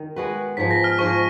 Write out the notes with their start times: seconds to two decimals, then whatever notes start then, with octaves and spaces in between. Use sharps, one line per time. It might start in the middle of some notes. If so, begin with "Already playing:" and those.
Already playing: D#3
0.16 G#3 B3 F#4 B4
0.57 G#2 F3 G#3 B6
0.71 A#6
0.84 F6
0.99 G#2 F3 G#3 C#6